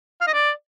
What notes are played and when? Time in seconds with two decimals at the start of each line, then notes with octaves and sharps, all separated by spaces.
0.21 F5
0.27 D#5
0.33 D5